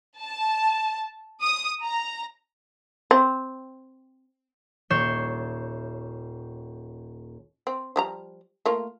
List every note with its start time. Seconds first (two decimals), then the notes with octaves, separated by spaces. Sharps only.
0.20 A5
1.41 D#6
1.83 A#5
3.11 C4
4.90 D#1 C#5 G6 C7 E7
7.67 C4
7.96 F3 G3 A#5
8.66 A3 A#3 F4